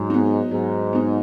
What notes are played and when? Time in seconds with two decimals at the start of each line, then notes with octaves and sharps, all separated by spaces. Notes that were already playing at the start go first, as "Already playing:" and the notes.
Already playing: G#2 F#3
0.10 B3 D#4
0.51 G#2 F#3
0.93 B3 D#4